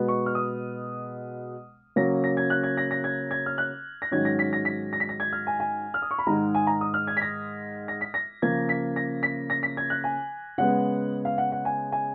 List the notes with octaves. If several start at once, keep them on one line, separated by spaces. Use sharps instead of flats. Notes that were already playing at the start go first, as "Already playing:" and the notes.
Already playing: B2 G#3 B3
C#6
F6
D#6
C#3 F#3 A#3 C#4 A#6
A#6
G#6
F#6
G#6
A#6
A#6
G#6
G#6
F6
F#6
A#6
G#2 D#3 F#3 C#4 G#6
A#6
B6
A#6
B6
A#6
B6
A#6
G#6
F6
G#5
G#5
F6
D#6
C#6
B5
G#2 D#3 G#3 A#5
G#5
A#5
D#6
F6
G#6
B6
A#6
A#6
B6
A#6
C#3 F3 A#3 C#4 G#6
B6
A#6
B6
A#6
B6
G#6
F#6
G#5
C#3 G#3 B3 F#5
F5
F#5
F#5
G#5
G#5